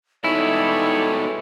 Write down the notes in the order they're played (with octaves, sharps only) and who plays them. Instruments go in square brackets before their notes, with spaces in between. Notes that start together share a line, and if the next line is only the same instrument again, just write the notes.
[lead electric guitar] B2 G#3 [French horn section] G3 A4 C#5 [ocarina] D#4 [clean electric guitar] E4